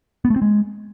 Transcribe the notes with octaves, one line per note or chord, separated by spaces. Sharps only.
B3
A3
C4
G#3